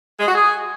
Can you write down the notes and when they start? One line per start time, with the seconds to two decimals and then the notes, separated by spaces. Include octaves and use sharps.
0.19 G#3
0.27 F#4
0.35 G#4